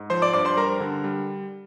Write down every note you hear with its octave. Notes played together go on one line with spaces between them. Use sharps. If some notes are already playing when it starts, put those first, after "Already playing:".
Already playing: G#2
F3 C5 C6
D5 D6
G2 D5 D6
C5 C6
G3 A#4 A#5
D3
G3